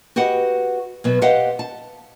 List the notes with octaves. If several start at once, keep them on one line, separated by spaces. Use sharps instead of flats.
F#4 G4 B4 D#5 F#5
B2 F#3 B3
G4 B4 C5 D#5 F5 F#5
A5